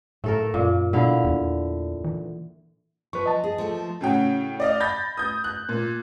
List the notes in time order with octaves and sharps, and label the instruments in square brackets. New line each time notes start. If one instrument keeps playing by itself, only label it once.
[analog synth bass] A2 [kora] A3 A4 A#4
[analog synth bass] F#2 [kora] A#2
[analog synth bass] B2 [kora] D3 E4 F5
[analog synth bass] E2
E3
[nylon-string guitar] F3 [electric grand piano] B4 C#6
[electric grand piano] D#5 A5
[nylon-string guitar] G#4
F3 A3
[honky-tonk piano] A2 C#3 C#4 F#4 G5
D5 D#5 F5
B5 G6 A6 A#6
D#6 G6
F#6
A#2